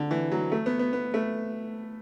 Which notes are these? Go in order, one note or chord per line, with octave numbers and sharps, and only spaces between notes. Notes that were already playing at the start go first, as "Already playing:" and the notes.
Already playing: D3
E3
F#3
A3
B3
B3
B3
A3